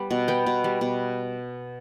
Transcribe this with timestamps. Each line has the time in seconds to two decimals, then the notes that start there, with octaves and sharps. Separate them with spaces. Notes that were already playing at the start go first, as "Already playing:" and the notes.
Already playing: G3 B3
0.11 B2
0.28 B3 G5
0.46 B2
0.64 G3
0.81 B2